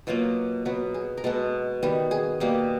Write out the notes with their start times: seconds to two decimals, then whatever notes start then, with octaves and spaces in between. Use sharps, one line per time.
0.07 B2 F#3 A#3 F4
0.65 B2 F#3 B3
0.94 G#4
1.17 A#4
1.24 B2 G#3 B3 A4
1.83 D#3 G3 B3
2.11 G#4
2.40 B2 G3 A#3